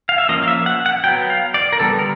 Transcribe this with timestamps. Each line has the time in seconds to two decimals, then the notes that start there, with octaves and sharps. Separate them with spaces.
0.09 F5
0.18 E5
0.29 F3 A#3 C#4 D#5
0.43 F5
0.48 E5
0.66 F#5
0.86 F#5
1.04 F#3 B3 G5
1.30 F5
1.54 D5
1.73 A#4
1.80 D3 G3 B3 A4
1.99 A#4